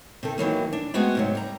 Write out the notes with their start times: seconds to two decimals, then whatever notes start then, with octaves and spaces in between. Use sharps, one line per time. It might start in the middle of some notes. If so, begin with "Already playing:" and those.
0.23 C3 D#3 A4
0.38 D#3 E3 F#3 A#3
0.73 D4
0.94 G#3 A3 B3 C4 F#4 G#4
1.15 G#2 C3 F#3
1.35 G3 A#5